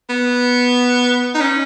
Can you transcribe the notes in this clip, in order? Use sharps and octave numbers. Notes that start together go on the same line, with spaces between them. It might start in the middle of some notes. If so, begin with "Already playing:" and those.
B3
D#4
C#4